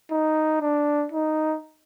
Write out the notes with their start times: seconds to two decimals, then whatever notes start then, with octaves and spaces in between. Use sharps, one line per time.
0.11 D#4
0.61 D4
1.12 D#4